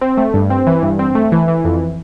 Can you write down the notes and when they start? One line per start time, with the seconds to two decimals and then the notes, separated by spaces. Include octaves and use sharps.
0.01 C4
0.17 A3
0.34 G2
0.50 C4
0.67 E3
0.83 G2
0.99 C4
1.15 A3
1.32 E3
1.48 E3
1.65 F2